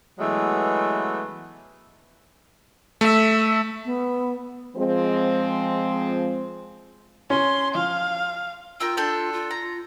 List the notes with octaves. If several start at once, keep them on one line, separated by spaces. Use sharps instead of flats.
E3 F#3 G#3 A3 B3
A3 E5
B3
F3 G#3 C4
C#4 C6
F3 F5
F4 A#4 G5 E6
D4 A4 G5
F4
A#5